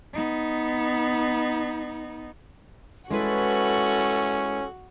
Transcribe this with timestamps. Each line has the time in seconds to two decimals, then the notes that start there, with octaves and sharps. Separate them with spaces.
0.13 B3 D#4
3.10 G#3 C#4 E4 F#4 A4 B4